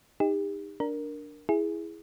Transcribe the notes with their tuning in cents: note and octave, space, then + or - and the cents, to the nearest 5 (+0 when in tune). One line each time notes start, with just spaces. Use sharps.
D#4 +0 G4 +40
D4 +0 A#4 +0
E4 +0 G#4 +0